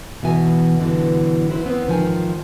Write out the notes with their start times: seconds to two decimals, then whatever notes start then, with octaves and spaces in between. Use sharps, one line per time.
0.22 E2 B2 E3 E5 G#5
0.79 G2 B2 D3 E3
1.49 F#3 E4 B4 C5
1.66 B3 C4
1.87 G#2 D#3 F3 G#5